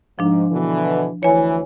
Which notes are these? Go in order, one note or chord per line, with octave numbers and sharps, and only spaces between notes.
G#2 F3 D4
B2 D3 E3
D2 E3 C#5 G#5